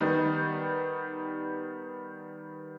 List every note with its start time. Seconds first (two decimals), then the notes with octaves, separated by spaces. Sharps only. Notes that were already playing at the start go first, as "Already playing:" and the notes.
0.01 D#3 G3 B3 D#4